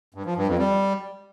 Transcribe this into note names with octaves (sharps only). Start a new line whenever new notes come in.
G2
F3
G2
F2
G3